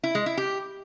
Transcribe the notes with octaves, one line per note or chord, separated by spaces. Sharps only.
E4
G#3
E4
G4